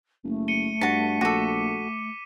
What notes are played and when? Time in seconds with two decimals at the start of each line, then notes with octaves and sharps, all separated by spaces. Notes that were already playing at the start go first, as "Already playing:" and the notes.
0.24 F#1 A3
0.48 C#7 D#7 G7
0.81 G2 F#4 A5 B6
1.21 A#1 F#4 A4 D6 D#7